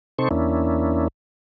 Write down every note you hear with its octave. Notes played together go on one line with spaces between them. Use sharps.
C3 C4 D#4 A4 C5 C#6
E2 A#3 C#4 D4 E4